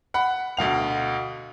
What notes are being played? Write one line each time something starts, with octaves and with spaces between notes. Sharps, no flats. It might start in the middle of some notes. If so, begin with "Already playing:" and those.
F#5 B5
D2 B2 F5 F7